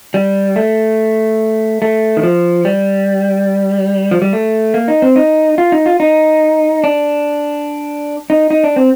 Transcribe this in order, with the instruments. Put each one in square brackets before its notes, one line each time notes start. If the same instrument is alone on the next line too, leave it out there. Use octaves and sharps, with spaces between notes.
[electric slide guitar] G3
A3
A3
D#3
F3
G3
F3
G3
A3
A#3
D#4
C4
D#4
F4
D#4
F4
D#4
D4
D#4
D#4
D4
C4